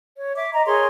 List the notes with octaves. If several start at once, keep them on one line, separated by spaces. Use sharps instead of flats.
C#5
E5 D6
D#5 A#5
G#4 A#4 C#5 C6